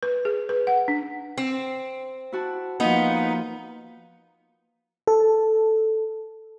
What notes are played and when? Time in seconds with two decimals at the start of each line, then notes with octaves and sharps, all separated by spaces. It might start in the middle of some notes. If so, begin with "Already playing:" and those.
0.03 B4
0.25 G#4
0.49 B4
0.67 F#5
0.88 D4
1.37 C4
2.32 E4 F#4 A5
2.80 F3 A#3 B3 D#4
5.07 A4